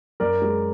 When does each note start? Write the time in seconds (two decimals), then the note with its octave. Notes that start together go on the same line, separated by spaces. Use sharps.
0.20 F#2 A#4 D5
0.42 G#3